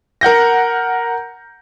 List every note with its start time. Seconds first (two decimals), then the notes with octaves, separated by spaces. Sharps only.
0.21 A#4 F#5 G6 A#6